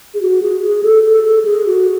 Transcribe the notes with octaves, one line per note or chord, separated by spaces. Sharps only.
G#4
F#4
G#4
G#4
A4
A4
A4
G#4
F#4